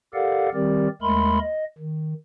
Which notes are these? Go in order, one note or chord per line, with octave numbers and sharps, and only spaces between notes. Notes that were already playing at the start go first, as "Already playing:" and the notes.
G4 A4 A#4 D5 F5 F#5
D#3 G3 C4 G4 A#4 D5
D#2 G#3 A3 A#4 B5 C6
D#5
D#3